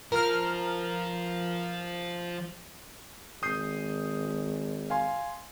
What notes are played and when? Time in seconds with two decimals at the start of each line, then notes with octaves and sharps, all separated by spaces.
0.12 F3 A#4 F6
3.43 G#1 D#6 G6 C7
4.90 F5 G#5 C6